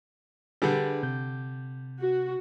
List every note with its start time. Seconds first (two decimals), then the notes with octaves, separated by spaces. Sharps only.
0.62 D3 G3 D4 G#4 B4
1.03 C3 G6
2.00 F#4